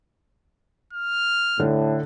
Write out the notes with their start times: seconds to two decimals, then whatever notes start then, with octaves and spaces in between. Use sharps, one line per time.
0.93 F6
1.60 A2 D3